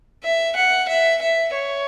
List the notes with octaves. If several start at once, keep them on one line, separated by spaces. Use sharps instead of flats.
E5
F#5
E5
E5
C#5